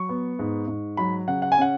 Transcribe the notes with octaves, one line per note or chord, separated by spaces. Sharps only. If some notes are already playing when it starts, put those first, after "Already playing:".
Already playing: F#3 C#6
B3
G#2
G#2
F#3 B5
C#3 F#5
F#5
G#5
C#4 F#5